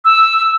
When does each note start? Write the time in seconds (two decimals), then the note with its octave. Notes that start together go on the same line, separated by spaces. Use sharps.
0.05 E6